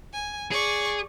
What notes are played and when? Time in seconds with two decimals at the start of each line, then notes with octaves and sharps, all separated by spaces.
0.13 G#5
0.51 G#4 D5 C#6